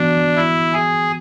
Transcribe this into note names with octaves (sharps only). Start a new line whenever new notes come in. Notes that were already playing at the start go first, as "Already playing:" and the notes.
Already playing: E3 B3 D4 F#4
E4
G#4